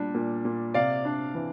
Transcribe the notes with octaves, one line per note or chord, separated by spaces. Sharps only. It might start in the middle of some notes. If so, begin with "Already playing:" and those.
Already playing: A#2 G3 D4
A#2
A#2
C3 D5 F5
D4
E3